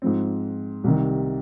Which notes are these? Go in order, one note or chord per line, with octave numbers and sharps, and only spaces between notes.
G#2 F3 C4
C2 C3 D#3